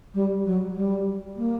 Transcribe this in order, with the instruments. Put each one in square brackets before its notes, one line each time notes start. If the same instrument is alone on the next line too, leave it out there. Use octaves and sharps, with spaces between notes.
[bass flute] G3
F#3
G3
A#3